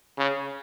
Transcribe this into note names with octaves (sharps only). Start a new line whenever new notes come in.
C#3